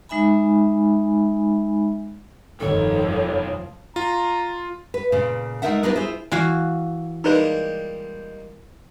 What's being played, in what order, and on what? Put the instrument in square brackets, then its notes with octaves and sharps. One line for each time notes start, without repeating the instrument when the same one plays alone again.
[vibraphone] G#3 D#4 E5 G#5 B5
[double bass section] F1 G2 D#3 [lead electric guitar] B1 C#5 [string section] F3 [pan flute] A4
[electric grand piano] F4 [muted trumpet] A#5
[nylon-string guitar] B4
A#2 C#3
G#3 A3 D#4 A#4 E5 F#5
B3 D4 D#4 F4 A#4 B4
E4 F4 G#4 C5
[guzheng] E3 F#4 F5
[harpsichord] G3 G#3 A#3 [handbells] D#4 B4